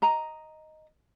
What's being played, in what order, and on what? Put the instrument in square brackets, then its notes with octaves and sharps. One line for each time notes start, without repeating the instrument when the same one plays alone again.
[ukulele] D#5 A#5